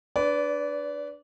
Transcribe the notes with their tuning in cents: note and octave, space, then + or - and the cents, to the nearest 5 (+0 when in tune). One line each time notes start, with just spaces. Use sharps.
D4 +0 B4 +10 D5 -25